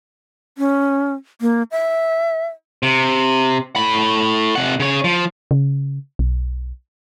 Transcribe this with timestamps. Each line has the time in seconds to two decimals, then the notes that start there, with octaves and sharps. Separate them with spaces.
0.58 C#4
1.41 A#3
1.71 E5
2.83 C3
3.76 A2 B5
4.55 C3 F#5
4.80 C#3 C#5
5.04 F3
5.51 C#3
6.19 B1